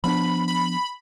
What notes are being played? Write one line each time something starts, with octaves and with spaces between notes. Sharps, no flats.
F3 B3 D4 B5
B5